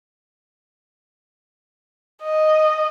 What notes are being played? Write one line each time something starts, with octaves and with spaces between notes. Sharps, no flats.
D#5